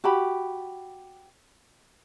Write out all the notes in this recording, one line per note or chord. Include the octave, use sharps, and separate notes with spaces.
F#4 G4 B5